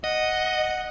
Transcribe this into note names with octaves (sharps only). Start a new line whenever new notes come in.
D#5 F#5